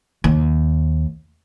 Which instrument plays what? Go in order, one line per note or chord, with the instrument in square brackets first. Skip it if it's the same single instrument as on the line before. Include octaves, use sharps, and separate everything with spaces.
[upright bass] D#2